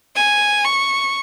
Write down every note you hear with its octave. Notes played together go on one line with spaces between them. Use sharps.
G#5
C#6